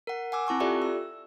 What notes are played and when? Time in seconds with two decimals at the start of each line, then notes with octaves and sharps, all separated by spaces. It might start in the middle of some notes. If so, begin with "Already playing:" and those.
0.07 A#4 F#5
0.32 F#5 G#5 D6 E6
0.47 C4 E4 A5 C#6 E6
0.60 F4 G4 A4 D5 E5
0.82 E6